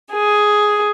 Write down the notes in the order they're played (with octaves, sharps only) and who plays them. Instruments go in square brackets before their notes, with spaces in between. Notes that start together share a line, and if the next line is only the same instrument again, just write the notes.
[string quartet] G#4